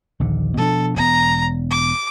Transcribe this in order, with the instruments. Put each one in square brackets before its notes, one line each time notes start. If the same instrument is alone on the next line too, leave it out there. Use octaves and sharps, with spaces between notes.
[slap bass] A#1 D#2 D3
[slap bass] B2 F3 D4 [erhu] A4
[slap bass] E1 B3 [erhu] A#5
[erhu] D6